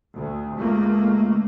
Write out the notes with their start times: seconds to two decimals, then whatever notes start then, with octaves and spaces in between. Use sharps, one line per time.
0.15 D2
0.55 C#2 A3 A#3